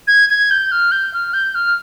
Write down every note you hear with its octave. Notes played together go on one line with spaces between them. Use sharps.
G#6
G#6
G6
F6
G6
F6
G6
F6